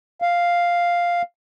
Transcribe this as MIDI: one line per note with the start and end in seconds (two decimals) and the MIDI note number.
0.22 1.22 77